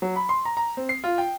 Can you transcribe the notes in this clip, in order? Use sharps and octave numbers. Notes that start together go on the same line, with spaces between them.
F#3
B5
C6
A#5
A#5
C4
C7
F4
G5